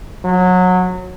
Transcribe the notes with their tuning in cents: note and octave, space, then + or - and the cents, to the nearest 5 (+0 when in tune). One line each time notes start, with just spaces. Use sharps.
F#3 -20